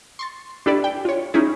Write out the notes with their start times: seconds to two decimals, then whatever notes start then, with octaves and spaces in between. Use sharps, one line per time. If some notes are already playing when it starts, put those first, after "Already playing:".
0.19 C6 C#6 A6
0.66 D4 E4 G4 A4 B4 D5
0.84 G5
1.05 F4 C#5
1.34 C#4 D#4 E4 G#4